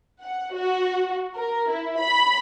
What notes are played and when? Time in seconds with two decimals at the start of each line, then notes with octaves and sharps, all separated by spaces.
0.22 F#5
0.53 F#4
1.36 A#4
1.70 E4
1.99 B5